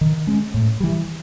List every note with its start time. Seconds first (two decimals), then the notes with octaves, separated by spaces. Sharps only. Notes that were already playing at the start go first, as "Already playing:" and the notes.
0.01 D#3
0.27 G#3 C#4
0.54 A2
0.80 E3 G3